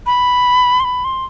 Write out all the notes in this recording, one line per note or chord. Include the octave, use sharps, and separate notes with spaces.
B5
C6
B5
C6